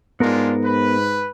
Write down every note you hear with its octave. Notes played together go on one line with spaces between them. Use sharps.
G#2 G#3 B3 D4 F4 A#4
B4